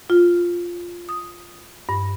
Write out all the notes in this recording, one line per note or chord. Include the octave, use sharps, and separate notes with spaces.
F4
D#6
G2